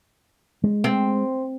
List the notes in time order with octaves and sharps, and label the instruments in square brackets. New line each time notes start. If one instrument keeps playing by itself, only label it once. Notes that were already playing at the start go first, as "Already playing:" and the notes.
[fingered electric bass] G#3
[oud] C4